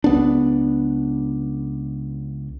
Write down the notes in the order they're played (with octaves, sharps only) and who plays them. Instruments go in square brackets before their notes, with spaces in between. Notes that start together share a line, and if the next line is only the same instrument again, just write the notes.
[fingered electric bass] C#2 B3 D4